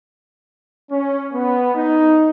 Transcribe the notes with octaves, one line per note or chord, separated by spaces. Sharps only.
C#4
B3
D#4